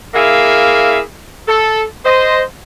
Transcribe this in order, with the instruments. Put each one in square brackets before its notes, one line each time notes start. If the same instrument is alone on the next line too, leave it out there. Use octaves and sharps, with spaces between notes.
[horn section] A#3 E4 G#4 E5 F5
A4
C5 D#5